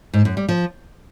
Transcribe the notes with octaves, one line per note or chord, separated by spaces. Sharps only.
G#2
F#2
G3
F3